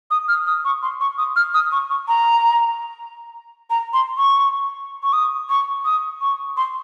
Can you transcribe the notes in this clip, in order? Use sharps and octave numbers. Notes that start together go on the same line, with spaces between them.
D#6
F6
D#6
C#6
C6
C#6
D#6
F6
D#6
C#6
C#6
A#5
A#5
C6
C#6
C#6
D#6
C#6
D#6
C#6
C6